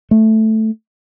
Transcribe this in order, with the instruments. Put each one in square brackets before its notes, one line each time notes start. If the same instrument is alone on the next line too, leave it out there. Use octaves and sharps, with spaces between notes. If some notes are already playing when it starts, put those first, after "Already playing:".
[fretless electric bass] A3